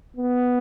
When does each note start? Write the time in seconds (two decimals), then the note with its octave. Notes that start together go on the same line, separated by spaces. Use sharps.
0.16 B3